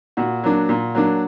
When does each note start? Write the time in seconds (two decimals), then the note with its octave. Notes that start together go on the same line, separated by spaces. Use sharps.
0.17 A#2 F#4
0.44 F#3 A#3 D4
0.69 A#2
0.95 F#3 A#3 D4